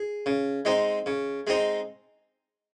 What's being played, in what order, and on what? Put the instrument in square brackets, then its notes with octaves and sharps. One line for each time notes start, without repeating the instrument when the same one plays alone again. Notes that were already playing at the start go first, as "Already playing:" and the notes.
Already playing: [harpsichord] G#4
C#3
G#3 C4 D#4
C#3
G#3 C4 D#4